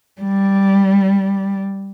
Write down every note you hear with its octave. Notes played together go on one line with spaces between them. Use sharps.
G3